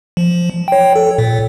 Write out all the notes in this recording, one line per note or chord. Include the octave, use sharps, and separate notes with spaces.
F3
C#5 G5
A4
A#2